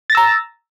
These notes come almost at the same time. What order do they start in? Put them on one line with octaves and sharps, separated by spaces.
A6 A#6 E6 A#5